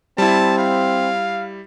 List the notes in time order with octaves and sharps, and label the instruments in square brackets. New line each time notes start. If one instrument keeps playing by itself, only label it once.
[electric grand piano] G3 E4 [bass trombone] C4 [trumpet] A5
[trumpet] F5